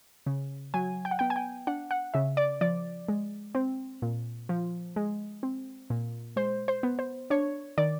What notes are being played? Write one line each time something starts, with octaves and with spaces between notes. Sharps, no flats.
C#3
F#3 G#5
G5
F#5
B3 G5
G#5
G5
D4 F#5
F#5
C#3 E5
D5
F3 D5
G#3
C4
A#2
F3
G#3
C4
A#2
G#3 C5
C5
B3
C5
D4 C#5
D#3 D5